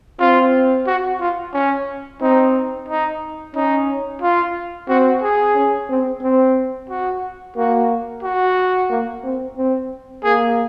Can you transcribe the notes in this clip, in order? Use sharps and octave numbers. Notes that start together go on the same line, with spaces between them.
C4 F4
F#4
F4
C#4
C4 D#4
D#4
C#4 D#4
F4
C4 F#4
G#4
C#4
C4
C4
F#4
A#3 F#4
F#4
A#3
C4
C4
A#3 G#4